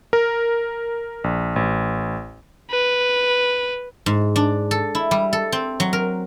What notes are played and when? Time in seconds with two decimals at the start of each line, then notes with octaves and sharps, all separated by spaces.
0.13 A#4
1.24 A#1
1.56 A1
2.71 B4
4.06 G#2
4.36 D4
4.71 A4
4.95 E4
5.11 G3
5.33 A4
5.52 C4
5.80 F#3
5.93 A#4